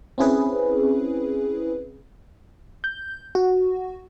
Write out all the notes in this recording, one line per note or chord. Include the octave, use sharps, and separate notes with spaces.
C4 C#4 E4 G#4 B4
G6
F#4